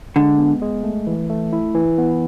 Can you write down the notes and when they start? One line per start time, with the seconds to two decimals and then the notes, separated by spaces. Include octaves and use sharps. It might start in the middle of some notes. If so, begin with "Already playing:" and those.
0.16 D3 G#3
0.38 B3
0.62 G#3
0.84 A3
1.07 E3
1.30 A3
1.53 E4
1.75 E3
1.98 B3